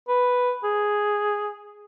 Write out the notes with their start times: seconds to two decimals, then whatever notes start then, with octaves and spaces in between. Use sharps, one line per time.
0.08 B4
0.64 G#4